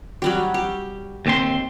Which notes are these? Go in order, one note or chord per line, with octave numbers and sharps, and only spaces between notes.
F#3 G3 G4
G4
D#2 C4 C6